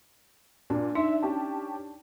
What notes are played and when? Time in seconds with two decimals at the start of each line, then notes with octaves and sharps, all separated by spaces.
0.70 A#2 D4
0.95 D#4 E5
1.22 C#4 G4 A5